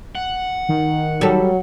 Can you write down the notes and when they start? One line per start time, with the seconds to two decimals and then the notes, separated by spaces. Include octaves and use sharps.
0.15 F#5
0.69 D#3
1.21 F#3 G3 A4